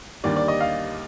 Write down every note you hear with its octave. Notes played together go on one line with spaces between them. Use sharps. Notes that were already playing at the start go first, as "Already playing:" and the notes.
D#2 D3 G3 A#3 D5
D5
D#5
F5